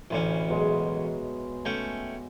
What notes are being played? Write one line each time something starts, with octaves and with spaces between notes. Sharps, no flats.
A1 D2 C#4 E5 B5
B2 F#3 G#3
A3 C#4 G5